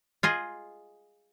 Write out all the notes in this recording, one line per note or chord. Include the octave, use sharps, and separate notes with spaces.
F4 G#4 D#5